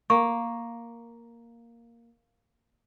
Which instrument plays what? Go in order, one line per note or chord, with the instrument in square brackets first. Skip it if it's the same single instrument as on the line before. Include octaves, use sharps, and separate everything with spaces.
[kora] A#3 [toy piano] C#6